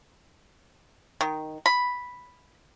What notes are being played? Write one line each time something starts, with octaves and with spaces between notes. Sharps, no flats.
D#3
B5